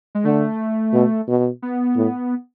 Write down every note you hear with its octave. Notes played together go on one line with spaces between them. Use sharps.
G#3
D3 A3
B2
B2
B3
A2